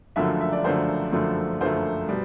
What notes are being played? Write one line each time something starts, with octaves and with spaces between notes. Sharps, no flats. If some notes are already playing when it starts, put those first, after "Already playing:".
F#1 F#2 D3 F3 A3 E5
E5
D5
F#1 F#2 D3 F3 A3 C5
F#1 F#2 D3 F3 A3
F#1 F#2 D3 F3 A3 C5
B2 G3